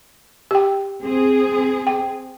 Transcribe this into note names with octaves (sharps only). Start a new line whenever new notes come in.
G4 G5
C4 G#4
G5